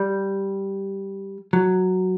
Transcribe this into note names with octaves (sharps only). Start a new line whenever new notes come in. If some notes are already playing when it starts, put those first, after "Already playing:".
Already playing: G3
F#3